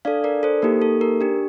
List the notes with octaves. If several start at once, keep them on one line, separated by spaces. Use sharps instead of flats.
D4 A4 D5 F5
A#4 D5
A4 C5
A#3 D#4 G4 A#4
A4
A#4
D4 G4